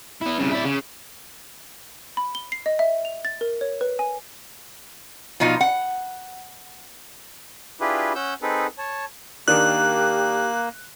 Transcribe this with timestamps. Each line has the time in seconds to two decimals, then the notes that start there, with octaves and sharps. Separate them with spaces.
0.21 B3 E4
0.39 C2 C#3
0.51 E4 D5
0.65 C#3
2.17 B5
2.35 G7
2.52 C7
2.66 D#5
2.79 E5
3.05 F7
3.25 A6
3.41 A#4
3.61 C#5
3.81 B4
3.99 G#5
5.40 B2 F3 D#4 F4
5.61 F#5
7.80 D4 E4 F4 G4 G#4 B4
8.15 C#4 F#5 E6 G6
8.42 C4 D#4 G#4 A4 B4
8.78 C#5 A5
9.48 D#3 A#3 D4 G4 F#6